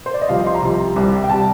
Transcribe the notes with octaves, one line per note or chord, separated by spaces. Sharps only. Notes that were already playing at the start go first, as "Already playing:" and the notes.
C5
D5
D#5
C2 C3 F3 F5
C6
A#5
C2 C3 F3
C2 C3 G3
G5
C3 G3 A5